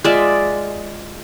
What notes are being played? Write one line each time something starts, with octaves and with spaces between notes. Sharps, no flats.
G#3 F4 D5 E5